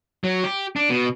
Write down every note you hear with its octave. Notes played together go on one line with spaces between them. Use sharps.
F#3
G4
D4
B2